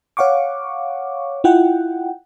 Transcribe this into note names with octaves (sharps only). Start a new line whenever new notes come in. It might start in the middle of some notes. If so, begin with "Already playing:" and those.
C#5 F5 F#5 C#6 D6
E4 F4 F#5 G5